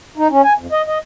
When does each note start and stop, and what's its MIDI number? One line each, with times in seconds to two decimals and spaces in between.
0.18 0.28 63
0.30 0.42 61
0.43 0.53 80
0.58 0.67 41
0.72 0.82 75
0.87 0.98 75